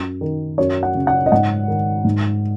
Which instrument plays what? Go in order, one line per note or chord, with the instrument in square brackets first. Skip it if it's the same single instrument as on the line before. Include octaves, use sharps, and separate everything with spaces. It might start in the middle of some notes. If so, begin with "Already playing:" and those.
Already playing: [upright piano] F#2
D#3
F#2 C#5
F#5
C#3
F#5
D#5
G#2 F#5
D#3
G#2